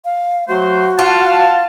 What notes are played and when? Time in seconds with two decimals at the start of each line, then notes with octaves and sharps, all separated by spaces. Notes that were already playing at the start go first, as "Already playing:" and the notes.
0.05 F5
0.49 F#3 A3 F#4 C5
0.99 F4 F5 F#5 A5